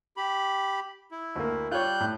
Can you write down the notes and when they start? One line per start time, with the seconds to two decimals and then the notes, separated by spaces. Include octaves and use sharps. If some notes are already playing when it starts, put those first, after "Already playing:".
0.17 G4 B5
1.11 E4
1.36 D2 A#3
1.71 G3 F4 C#5 F#6 G6
2.00 A2